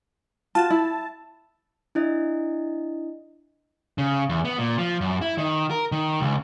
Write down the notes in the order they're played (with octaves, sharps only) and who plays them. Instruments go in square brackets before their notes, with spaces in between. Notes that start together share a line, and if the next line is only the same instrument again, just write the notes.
[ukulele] F4 F#4 [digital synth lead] A5
[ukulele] E4
[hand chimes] D4 E4 D#5
[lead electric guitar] C#3
E2
B3
A#2
F3
F#2
E4
D#3
A#4
D#3
C#2